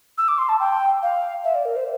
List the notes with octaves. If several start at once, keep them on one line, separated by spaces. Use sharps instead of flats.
E6
D6
C6
A5
G5
F5
E5
D5
A#4
C5